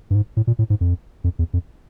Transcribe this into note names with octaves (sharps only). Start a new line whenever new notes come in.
G2
G#2
A2
A#2
A2
G#2
F2
F2
E2
F2